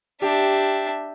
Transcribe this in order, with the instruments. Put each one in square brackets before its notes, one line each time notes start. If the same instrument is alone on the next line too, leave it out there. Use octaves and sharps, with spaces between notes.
[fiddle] D4 E5 [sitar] G4